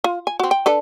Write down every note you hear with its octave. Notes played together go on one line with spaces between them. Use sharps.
F4
G#5
C4 F#4
G5
D4 A4 B4